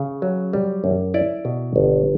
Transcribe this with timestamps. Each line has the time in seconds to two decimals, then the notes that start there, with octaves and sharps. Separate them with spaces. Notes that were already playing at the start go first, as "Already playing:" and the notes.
Already playing: C#3
0.22 F#3
0.53 G3
0.84 F#2
1.14 E4 D5
1.45 B2
1.76 G1